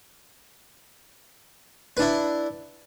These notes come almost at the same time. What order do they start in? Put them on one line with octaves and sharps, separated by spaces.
B4 D4 E4